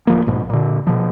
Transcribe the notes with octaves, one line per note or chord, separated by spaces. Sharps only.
D1 F3 A#3
A#1 G#2 B2
A#2 D3
B2 F3